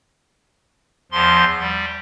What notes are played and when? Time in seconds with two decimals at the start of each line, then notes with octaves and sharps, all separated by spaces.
1.12 E2 F3 C6
1.59 G3